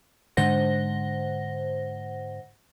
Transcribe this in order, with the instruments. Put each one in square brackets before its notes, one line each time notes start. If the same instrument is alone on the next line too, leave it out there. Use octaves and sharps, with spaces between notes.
[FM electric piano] G#2 D3 C5 F#5 A#6